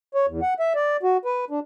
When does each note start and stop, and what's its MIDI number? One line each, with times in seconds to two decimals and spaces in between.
0.14 0.26 73
0.28 0.40 40
0.42 0.54 78
0.60 0.73 76
0.75 0.97 74
1.03 1.17 66
1.25 1.45 71
1.50 1.60 62